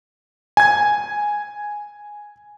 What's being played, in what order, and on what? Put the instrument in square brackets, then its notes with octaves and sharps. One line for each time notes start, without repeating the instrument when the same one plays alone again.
[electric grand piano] G#5 G#6